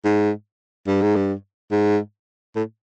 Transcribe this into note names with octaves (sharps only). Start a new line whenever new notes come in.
G#2
G2
G#2
G2
G#2
A2